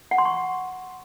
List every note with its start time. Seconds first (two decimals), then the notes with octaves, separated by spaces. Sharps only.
0.11 F#5
0.18 C6
0.25 C#6